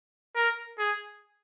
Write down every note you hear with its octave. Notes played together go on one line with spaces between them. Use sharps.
A#4
G#4